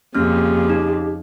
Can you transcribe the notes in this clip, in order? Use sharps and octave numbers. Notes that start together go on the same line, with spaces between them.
F2 C#3 A#3 C#4 G4 F6
D#4